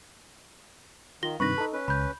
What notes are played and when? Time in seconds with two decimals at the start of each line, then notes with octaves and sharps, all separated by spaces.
1.23 D#3 F4 A#6 G7
1.40 G2 C3 D#3 B4 B5 C#6 A#6
1.58 D#4 A4
1.73 C#4 B4
1.88 C#2 B5 G6